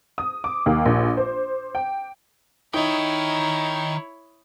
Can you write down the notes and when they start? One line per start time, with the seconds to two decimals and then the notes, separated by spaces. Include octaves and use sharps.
0.18 D#6
0.44 D6
0.66 D#2
0.85 A#1
1.17 C5
1.75 G5
2.74 D#3 D#4 E4 C#5 G5